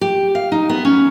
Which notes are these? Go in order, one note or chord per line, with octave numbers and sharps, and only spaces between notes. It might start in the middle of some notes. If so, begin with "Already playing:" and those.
G4
F5
D#4
B3
C#4